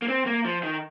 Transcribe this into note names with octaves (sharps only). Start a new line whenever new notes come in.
A#3
C4
A#3
F3
D#3